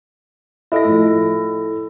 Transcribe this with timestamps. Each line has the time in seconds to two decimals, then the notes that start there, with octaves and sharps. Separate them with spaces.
0.72 E4 A4 D#5 E5 A#6
0.85 A2 F3